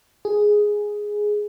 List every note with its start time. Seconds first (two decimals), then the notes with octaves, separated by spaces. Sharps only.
0.25 G#4